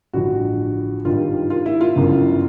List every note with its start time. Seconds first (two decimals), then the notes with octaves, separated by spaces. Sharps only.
0.13 A1 G2 D3 F3 F#4
1.05 G#1 G2 D#3 G3 F4
1.50 F4
1.66 E4
1.81 F4
1.96 G1 F#2 C#3 E3